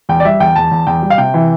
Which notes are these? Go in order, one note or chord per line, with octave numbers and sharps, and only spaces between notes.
E2 G5
D5
G3 E5
E2 G5
E2 A5
E2
E2 G5
G3
F5
C3 G5
E3